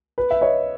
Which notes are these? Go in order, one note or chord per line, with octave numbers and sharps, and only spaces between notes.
B4
E5
C#5 D#5